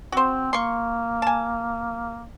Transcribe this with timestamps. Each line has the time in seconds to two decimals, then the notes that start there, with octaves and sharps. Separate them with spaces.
0.12 C4 F#4 C5
0.53 A#3 C6 C#6
1.22 G#5 A5